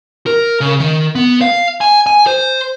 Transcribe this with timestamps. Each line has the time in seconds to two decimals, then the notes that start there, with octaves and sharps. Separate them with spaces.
0.26 A#4
0.61 C#3
0.80 D#3
1.15 B3
1.41 F5
1.81 G#5
2.07 G#5
2.27 C5